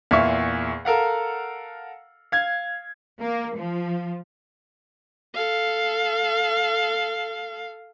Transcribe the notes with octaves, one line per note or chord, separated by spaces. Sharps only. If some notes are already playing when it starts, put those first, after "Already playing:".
E2 A#2 E5 F5 C#6
A4 A#4 F5 F#5
F5 G#6
A#3
F3
A4 F5